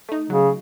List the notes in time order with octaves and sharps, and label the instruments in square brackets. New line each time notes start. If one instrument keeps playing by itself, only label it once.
[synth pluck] A3 D#4
[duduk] C#3 [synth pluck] F#3